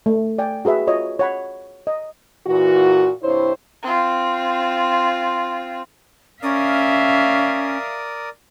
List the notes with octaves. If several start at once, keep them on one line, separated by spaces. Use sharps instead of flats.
A3
D5 G5 G#5
F#4 G#4 B4 E5
F4 C#5 D#5
C#5 F#5 B5
D#5
A#2 E3 F#4
G2 C3 E4 C5 C#5
C4 F4
C#4 A#4 D5 E5 F5 D#6